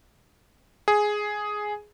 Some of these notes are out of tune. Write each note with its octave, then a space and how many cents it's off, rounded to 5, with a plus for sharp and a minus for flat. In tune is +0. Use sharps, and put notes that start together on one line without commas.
G#4 +5